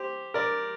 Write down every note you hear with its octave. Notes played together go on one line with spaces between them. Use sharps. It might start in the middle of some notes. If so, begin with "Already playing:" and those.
Already playing: G4 C5
A#4 D5